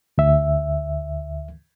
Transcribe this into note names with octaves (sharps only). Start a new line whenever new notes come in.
D2 E5